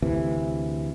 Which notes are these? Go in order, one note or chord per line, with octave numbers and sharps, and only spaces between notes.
D2 C3 E3